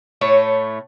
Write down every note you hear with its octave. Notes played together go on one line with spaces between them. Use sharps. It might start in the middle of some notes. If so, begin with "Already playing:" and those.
A2 A3 C#5